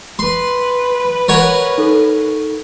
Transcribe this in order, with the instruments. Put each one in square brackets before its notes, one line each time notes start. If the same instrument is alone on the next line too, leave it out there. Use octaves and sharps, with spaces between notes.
[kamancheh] B4 [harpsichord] C6
[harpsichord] A#4 C#5 F#5
[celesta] D#4 A4